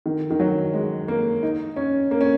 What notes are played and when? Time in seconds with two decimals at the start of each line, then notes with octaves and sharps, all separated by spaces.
0.06 D#3
0.31 D#3
0.40 F#3
0.74 G#3
1.08 A#3
1.43 D#4
1.76 C#4
2.11 A#3
2.21 C#4